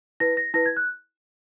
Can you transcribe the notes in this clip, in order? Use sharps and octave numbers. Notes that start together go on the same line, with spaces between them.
E4 B4 A#6
A#6
E4 B4 A#6
G#6
F#6